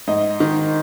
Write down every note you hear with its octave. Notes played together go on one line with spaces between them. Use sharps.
G#2 D#5
D#3